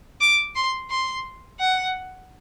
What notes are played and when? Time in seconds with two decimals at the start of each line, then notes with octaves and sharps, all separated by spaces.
0.21 D6
0.56 C6
0.90 C6
1.60 F#5